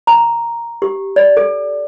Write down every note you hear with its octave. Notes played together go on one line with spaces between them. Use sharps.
A#5
G4
D5
A4